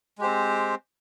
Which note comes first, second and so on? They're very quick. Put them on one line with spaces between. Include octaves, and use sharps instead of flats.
G#3 G4 C5 C4